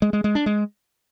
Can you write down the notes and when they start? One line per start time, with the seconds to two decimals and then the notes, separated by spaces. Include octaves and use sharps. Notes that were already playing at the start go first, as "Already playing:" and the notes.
0.02 G#3
0.13 G#3
0.24 G#3
0.35 D4
0.46 G#3